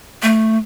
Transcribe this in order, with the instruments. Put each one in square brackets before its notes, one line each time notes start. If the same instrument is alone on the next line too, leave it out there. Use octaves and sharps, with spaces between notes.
[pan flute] A3